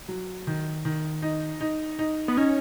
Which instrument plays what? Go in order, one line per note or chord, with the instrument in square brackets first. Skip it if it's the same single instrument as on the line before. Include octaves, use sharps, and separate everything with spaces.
[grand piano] F#3
D#3
D#3
D#4
D#4
D#4
[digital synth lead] B3
[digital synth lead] C#4 [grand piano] D#4